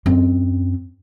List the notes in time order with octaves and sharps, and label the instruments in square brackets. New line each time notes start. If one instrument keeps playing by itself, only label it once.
[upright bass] F#2 C4